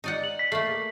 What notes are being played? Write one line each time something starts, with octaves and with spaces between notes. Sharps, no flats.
D#4 D5 F#5
F#7
B6
A3 A#3 C7